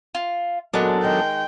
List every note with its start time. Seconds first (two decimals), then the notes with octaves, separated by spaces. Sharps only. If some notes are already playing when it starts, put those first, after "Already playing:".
0.15 F4
0.74 F#2 A#2 F#3 G#3 B3 D4 A4 A#4
1.04 D#3 G#3 G5